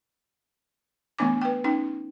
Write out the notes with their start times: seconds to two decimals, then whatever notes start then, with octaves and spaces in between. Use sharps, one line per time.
1.19 E3 A3 B3 D4 G#5 D6
1.42 B4 G5
1.64 C#4 D#4 G5